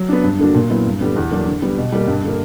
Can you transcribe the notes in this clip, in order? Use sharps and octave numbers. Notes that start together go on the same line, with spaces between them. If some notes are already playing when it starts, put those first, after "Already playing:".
Already playing: F#3
B3 D4
G2
D3 A#3 D4 F#4
A#2
F#3 B3 E4
G2
D3 G3 B3
E2
D3 F#3 A#3 D4
D3
G3 B3
B2
G3 A#3
G2
D3 A#3